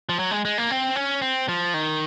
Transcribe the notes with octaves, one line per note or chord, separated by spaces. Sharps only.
F3
F#3
G#3
G#3
A#3
C4
C#4
C4
F3
D#3